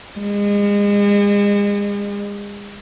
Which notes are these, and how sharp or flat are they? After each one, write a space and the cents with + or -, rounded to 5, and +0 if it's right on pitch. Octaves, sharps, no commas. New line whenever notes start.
G#3 -35